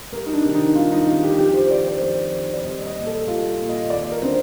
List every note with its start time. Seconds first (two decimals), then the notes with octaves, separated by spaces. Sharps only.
0.12 C2 A#4
0.26 D#4
0.34 D4
0.44 C3 D#3
0.55 D#4
0.75 C2 F4
0.92 D#4
1.07 D#3 F4
1.10 C3
1.24 G4
1.38 F2 G4
1.54 C5
1.70 D#3 D5
1.86 C5
2.01 F2 C5
2.33 D#3
2.54 D5
2.64 C2 D#5
2.86 D#5
2.96 A#2
3.07 A4
3.27 C2 F4
3.59 A#2
3.69 D#5
3.90 D#2 D5
4.12 A#4
4.22 D3 C4